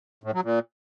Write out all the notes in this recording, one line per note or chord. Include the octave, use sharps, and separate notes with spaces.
A2
F#3
A#2